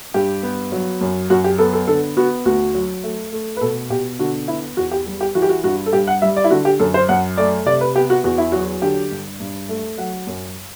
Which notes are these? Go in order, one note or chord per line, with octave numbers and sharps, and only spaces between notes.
G2 G4
B3
F#3
F#2
F#2 F#4
G4
B3 A4
A4
D3 A4
B3 F#4
D2 F#4
F#3
A3
A3
B4
B2 A4
B2 G4
D3 F#4
B3 E4
E2 F#4
G4
G3
G4
E3 F#4
G4
F#4
G2 F#4
A4
G2 G4
F#5
G3 E5
D5
E4
D3 F#4
G4
F#2 A4
C5
F#2 F#5
A3 D5
C3 D5
B4
B3 G4
F#4
E2 F#4
E4
F#3 F#4
D3 G4
G2
G2
A3
F#3 F#5
F#2